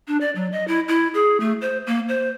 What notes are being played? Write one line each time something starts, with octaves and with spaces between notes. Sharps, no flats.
D4
D5
F#3
D#5
E4
E4
G#4
A3
C5
A#3
C5